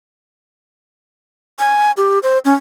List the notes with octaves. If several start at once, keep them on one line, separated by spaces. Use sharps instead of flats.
G#5
G4
C5
C#4